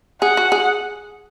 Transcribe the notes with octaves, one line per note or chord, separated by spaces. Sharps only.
G#4 F#5
F#4
G#4